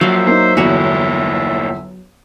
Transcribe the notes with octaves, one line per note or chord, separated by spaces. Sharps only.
A#2 F3 F#3 E5 F5
A#3 D#4 C5
G1 E2 A#2 E4 F#4 C#5